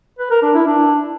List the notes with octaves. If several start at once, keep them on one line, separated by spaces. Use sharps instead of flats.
B4
A#4
D4
E4
D4